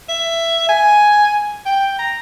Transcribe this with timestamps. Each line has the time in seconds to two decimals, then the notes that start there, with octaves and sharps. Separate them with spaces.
0.09 E5
0.69 G#5
1.66 G5
1.99 A#5